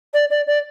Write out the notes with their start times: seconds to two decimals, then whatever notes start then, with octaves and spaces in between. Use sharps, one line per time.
0.13 D5
0.30 D5
0.47 D5